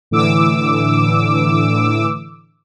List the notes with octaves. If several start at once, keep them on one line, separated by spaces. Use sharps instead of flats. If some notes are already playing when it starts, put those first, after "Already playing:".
A2 D3 E3 D6 E6